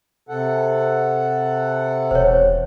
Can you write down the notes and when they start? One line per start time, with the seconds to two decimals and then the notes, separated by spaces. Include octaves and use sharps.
0.29 C3 A4 F#5
2.11 E1 C5 C#5